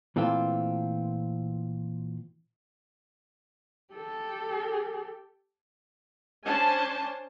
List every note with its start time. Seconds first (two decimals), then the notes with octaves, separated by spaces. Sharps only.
0.16 A#2 E3 A3 C4 F4
3.93 G4 A4
6.45 C#4 D4 C5 G#5 A5